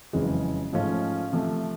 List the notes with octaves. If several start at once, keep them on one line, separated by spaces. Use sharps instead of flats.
F#1 F2 C#3 E3 G#3
G#2 F3 A3 C#4 F4
C3 F3 A3